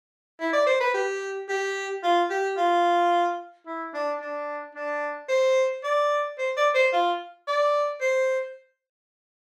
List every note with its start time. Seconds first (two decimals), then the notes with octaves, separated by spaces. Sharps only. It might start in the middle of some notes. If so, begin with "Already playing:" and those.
0.40 E4
0.53 D5
0.66 C5
0.80 B4
0.94 G4
1.49 G4
2.03 F4
2.30 G4
2.57 F4
3.66 E4
3.94 D4
4.21 D4
4.75 D4
5.29 C5
5.84 D5
6.38 C5
6.57 D5
6.74 C5
6.93 F4
7.47 D5
8.01 C5